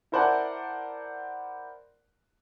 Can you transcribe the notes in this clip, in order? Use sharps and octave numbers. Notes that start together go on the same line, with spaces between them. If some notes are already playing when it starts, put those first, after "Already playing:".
E4 A#4 C5 D5 F#5 A5